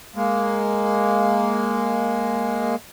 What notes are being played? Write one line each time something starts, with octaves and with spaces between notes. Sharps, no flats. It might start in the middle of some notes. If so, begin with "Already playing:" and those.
G#3 A#3